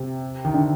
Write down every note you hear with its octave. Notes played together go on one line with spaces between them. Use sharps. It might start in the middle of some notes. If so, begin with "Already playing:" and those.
Already playing: C3
D#3
D3